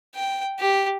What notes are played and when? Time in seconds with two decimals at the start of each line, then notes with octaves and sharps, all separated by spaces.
0.15 G5
0.59 G4